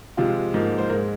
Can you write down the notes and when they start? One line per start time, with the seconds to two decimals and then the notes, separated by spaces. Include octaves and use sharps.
0.17 C3 F3 G#3 F4
0.54 G#2 F3 A#3
0.78 C5
0.89 G#2 G#3 A#4